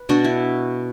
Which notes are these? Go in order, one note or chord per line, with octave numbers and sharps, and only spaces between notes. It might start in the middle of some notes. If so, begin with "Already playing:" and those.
Already playing: B4
B2 D4 F#4
E4